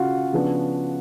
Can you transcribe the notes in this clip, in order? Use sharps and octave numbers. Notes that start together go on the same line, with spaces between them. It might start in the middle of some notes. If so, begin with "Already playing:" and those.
Already playing: C#3 F4 F#4 F5 F#5
C#3 F3 B3 D4